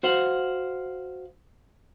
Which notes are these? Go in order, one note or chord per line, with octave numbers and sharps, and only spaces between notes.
F#4 C5 F5 F#5